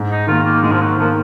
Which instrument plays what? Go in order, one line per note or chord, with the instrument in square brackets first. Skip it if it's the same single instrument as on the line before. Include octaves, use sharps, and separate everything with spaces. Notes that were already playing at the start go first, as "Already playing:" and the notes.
Already playing: [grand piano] G#2
[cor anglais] D#4
[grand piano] D#3 A#3 [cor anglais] F4
[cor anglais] A#3
[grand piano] G#2 [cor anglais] G#3
[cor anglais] F3
F#3
[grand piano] D#3 A#3 [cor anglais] F3